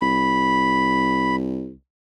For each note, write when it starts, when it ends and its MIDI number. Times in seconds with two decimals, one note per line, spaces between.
0.01 1.72 36
0.01 1.36 83